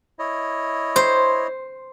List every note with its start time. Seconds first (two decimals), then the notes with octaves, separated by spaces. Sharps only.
0.19 E4 C#5 D#5
0.96 C5